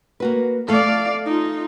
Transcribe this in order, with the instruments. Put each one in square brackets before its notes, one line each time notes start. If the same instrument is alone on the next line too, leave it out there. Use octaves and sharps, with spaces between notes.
[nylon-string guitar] A#3 F#4 B4
[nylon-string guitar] A3 A4 [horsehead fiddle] D5 F5
[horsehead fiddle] D#4 F4